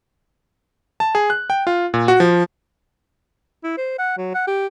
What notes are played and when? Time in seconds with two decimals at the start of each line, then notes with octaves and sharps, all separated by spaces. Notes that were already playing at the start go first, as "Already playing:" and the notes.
1.00 A5
1.15 G#4
1.30 F#6
1.50 G5
1.67 F4
1.94 A#2
2.08 F#4
2.20 F3
3.64 E4
3.78 C5
3.99 F#5
4.17 F#3
4.34 F#5
4.47 G4